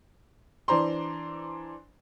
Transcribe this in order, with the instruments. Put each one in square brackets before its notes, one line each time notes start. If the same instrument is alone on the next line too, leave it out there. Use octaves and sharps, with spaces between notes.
[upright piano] E3 D4 C5 A#5 C6